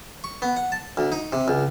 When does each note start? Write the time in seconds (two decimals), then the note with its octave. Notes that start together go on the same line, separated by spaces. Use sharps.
0.24 C#6
0.42 B3
0.56 F#5
0.72 A5
0.97 D2
1.12 D#4
1.33 C3
1.48 C#2